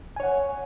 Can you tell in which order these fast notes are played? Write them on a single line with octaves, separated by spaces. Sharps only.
G#5 C#5 F#5